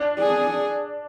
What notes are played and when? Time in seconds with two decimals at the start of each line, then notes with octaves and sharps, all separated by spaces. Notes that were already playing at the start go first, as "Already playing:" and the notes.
Already playing: D4
0.19 G#4